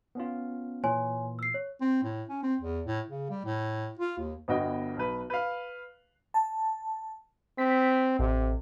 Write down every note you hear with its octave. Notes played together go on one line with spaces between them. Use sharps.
B3 C#4 F4
A#2 E3 C#5 G#5 C6
E6 C7
C#5
C4
A2
C#4
C4
E2
A2
C#3
G3
A2
F4
D#2
G1 G2 B3 F#4 D#5 G5
B1 B4
B4 F5
A5
C4 B6
A1 C3